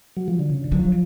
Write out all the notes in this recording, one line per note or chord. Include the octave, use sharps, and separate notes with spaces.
F#3
F3
D3
C#3
D3
F#3
F3